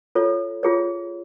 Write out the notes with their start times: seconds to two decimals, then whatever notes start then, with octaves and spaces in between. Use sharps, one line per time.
0.15 F4 A4 C#5
0.63 F4 G#4 C#5